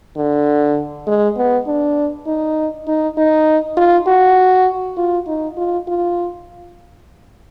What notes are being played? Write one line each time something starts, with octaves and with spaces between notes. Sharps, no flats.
D3
G#3
B3
D4
D#4
D#4
D#4
F4
F#4
F4
D#4
F4
F4